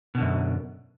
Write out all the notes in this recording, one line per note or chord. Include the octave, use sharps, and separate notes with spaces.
F#2 B2 D3